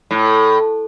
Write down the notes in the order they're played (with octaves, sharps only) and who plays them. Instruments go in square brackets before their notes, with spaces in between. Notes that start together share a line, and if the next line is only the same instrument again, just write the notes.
[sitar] A2